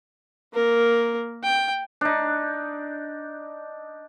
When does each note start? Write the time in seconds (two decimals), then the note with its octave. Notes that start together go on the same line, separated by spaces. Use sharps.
0.54 A#3 A#4
1.43 G5
2.01 D4 D#4